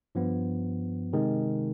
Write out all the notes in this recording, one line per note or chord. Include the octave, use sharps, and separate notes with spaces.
G2 F3 B3
C3 D#3 G#3